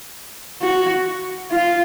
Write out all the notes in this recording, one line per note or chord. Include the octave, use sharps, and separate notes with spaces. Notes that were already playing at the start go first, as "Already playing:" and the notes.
F#4
F4